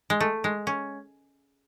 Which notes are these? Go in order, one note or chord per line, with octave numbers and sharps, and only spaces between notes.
G#3
A3
G#3
C#4